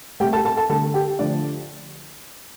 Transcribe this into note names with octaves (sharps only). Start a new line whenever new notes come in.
C3 A3 G4 G5
A4 A5
A4 A5
A4 A5
D3 A3 A4 A5
G4 G5
D3 F3 A3 D4 D5